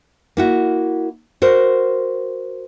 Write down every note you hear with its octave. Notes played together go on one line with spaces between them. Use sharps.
A#3 E4 F#4
F#4 A#4 C5